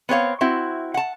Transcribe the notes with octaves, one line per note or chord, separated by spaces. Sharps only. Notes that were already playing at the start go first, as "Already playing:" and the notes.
B3 C4 C#5 F5
C4 E4 F#4
F#5 A5